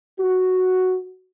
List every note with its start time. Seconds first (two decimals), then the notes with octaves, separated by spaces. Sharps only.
0.19 F#4